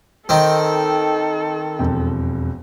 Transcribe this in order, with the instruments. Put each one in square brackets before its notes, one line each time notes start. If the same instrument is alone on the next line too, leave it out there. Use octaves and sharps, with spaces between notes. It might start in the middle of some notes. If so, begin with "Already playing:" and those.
[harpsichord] D#3 C4 [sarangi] A4
[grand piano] E1 F2 G5